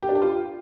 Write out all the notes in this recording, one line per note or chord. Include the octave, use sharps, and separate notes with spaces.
G4
D4
G4
F4